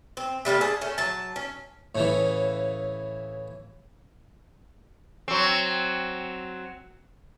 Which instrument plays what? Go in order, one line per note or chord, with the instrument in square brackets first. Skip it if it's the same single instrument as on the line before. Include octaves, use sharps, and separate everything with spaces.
[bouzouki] C4
C3 G3 A#3 A4
G#4 A5
A3 C#4
F#3 A5
C#4
[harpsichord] A2 C#3 E3
[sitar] F#3 C4